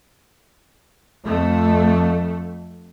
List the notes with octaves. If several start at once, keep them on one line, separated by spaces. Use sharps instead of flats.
F2 A3